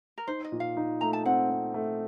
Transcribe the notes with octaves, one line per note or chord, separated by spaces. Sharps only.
A#4
D#4 C5
D#5
A#2
F5
D#4
A3 A#5
A5
C4 F#5
C4
A3